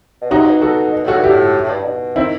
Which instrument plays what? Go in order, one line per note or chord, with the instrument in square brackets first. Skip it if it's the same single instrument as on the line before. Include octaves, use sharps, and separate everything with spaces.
[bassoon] B2
[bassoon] C3 [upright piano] D#4 F#4
[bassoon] B2
[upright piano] F#4 A4
[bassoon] B2
[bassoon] A2 [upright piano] F#4 A4
[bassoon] G2
[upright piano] E4 G4
[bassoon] A2
A2
G2
B2
[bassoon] D#3 [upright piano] C4 E4